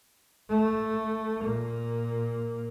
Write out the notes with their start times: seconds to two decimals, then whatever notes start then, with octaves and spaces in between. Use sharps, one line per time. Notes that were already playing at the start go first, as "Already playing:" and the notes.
0.49 A3
1.43 A#2 A#3